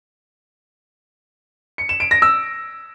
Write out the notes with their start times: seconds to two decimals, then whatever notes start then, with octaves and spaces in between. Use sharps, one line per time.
1.78 C#7
1.89 E7
2.00 D7
2.11 A#6
2.22 E6